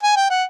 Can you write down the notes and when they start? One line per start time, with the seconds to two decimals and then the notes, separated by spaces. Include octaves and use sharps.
0.03 G#5
0.16 G5
0.30 F#5